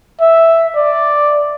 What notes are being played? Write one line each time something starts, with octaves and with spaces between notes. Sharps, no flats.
E5
D5